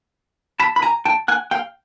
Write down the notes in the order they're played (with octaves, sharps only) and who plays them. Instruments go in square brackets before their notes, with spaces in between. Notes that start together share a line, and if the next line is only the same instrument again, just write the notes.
[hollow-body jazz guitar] A5 B5
B5
G#5 A#5
G5 A5
F#5 G#5
F5 G5